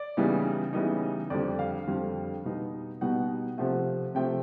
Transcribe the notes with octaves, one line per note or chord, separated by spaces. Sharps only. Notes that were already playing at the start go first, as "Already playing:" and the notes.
Already playing: D5
C#3 E3 G3 B3 D#4
C#3 E3 G3 B3 D#4
F2 D3 G3 D5
F5
F2 D3 G3
B2 G3 B3 D#4
B2 G3 B3 D#4 F#5
C3 F3 A3 F#5
C3 F3 A3 G5